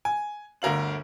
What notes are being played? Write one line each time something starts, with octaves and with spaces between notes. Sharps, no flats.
G#5
G1 D2 A#4 F5 F#7